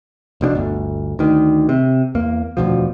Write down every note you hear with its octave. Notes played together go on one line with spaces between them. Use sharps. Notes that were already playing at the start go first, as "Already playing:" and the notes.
F1 B2 C4 D4
G1 D2
D2 D#3
C3
E2 A#3
E1 D2 B2 F3